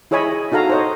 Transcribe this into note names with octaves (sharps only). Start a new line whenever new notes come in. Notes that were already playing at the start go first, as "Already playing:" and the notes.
E4 G#4 C#5 D#5 G#5 B5
D#4 F#4 A4 F5 A#5
C5 C#5 D#5